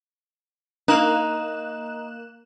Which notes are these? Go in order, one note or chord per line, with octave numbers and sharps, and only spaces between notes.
A#3 D#4 F#6 E7